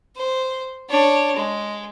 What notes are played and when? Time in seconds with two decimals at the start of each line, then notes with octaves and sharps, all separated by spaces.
0.16 C5
0.89 D4 C#5
1.36 G#3